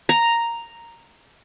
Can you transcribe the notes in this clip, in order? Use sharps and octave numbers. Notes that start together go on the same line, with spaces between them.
A#5